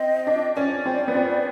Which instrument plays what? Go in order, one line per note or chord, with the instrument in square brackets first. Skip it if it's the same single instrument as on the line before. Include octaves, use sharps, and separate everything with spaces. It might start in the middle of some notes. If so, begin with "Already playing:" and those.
Already playing: [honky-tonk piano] C4 [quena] D#5
[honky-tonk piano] D4
[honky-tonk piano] C#4 [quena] D5
[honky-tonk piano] C4
B3
C4